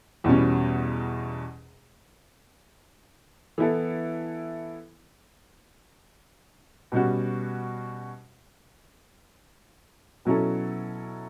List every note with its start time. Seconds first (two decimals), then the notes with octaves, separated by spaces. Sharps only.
0.24 E2 B2 G3 C#4
3.58 E3 B3 E4 A4
6.92 B2 G3 C#4 F#4
10.25 B2 F#3 C#4 E4 A4